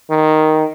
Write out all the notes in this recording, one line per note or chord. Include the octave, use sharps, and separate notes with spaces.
D#3